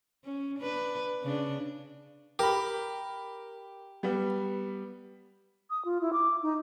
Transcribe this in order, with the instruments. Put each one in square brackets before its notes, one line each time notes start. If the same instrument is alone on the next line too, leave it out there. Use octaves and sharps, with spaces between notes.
[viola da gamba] C#4
D4 B4
C#3 D4
[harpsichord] G4 [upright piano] A#4 B5
[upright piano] G3 B3
[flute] D#6
F4
E4
D6
D#4